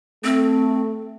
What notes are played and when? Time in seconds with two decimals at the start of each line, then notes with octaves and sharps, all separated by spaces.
0.24 A3 C4